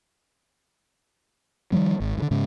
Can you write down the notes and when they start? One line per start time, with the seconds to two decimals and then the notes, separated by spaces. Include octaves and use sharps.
1.72 D#3 F3 G3 A#3
2.00 G#1
2.18 G2 D3
2.31 G#2 C#3